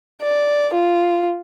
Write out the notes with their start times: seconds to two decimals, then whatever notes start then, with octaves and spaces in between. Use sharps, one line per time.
0.22 D5
0.74 F4